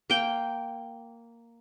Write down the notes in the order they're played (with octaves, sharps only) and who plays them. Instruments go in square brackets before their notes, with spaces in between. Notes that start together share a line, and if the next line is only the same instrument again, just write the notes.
[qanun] A#3 G5